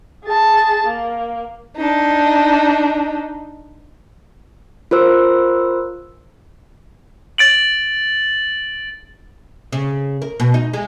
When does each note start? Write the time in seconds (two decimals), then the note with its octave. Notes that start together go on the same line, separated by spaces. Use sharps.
0.25 G#4 A5
0.87 A#3
1.77 D4 D#4
4.91 F4 A#4 C5 E6
7.38 A6 D7 F#7
9.72 C#3
10.22 A#4
10.40 B2
10.54 D#4
10.74 G#3